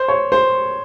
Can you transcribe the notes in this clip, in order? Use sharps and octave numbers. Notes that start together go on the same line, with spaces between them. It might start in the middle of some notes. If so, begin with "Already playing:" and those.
Already playing: C5
C#5
C5